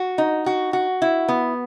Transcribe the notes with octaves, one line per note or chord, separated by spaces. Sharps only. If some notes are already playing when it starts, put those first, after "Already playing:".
Already playing: F#4
D#4
F#4
F#4
E4
B3